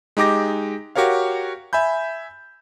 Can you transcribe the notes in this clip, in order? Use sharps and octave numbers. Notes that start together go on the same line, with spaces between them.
G#3 D#4 G4 D6 A#6
F#4 G4 A#4 C#5 F5
E5 G#5 B5 G6